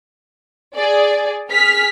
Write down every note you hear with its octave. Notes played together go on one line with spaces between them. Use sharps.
G#4 D5
G#4 F6 B6